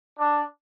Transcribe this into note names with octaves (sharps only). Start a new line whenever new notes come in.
D4